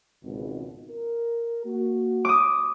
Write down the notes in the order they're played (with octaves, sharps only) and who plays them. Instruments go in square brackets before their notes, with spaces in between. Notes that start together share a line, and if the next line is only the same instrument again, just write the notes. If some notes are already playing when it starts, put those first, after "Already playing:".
[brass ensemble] G#1 C#2 B2
A#4
A#3 F#4
[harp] D6 D#6